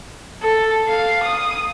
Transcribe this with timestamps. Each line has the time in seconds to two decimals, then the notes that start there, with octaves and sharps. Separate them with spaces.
0.42 A4
0.87 F5
1.23 D#6